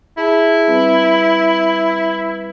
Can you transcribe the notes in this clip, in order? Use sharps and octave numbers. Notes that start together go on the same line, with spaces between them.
E4 G#4 A5 B5
G3 C4 B4